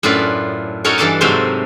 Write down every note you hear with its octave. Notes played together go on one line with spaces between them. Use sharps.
F#2 A2 D4 F4 B4
C#4 D#4 F#4 A4 A#4 C#5
G2 E3 D4 A4 D5 A5
G#2 C3 F#3 A3 A#4 C5